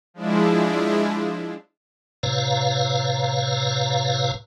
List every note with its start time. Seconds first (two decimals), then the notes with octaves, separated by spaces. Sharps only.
0.14 F3 G#3 D4 E4
2.23 A2 C3 B4 C#5 F5 A#5